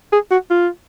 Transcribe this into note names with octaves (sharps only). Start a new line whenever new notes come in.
G#4
F#4
F4